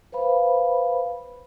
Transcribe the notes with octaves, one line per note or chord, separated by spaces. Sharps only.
B4 C5 F5 B5